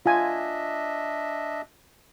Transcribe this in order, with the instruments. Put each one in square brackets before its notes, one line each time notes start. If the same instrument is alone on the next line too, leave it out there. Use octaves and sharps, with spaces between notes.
[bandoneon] D4 D#5 E5 [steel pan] F4 G#5